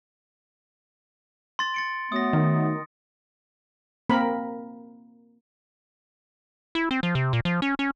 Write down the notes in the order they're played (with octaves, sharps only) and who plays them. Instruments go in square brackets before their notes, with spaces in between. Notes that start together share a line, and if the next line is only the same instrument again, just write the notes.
[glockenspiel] C6 A6
A6 C#7 D7
[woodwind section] F#3 A3 B3 [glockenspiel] D#6 A#6
[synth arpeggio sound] D#3
[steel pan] A#3 C4 A#4 B5
[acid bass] E4
C4
F3
C3
A#2
F3
C#4
C#4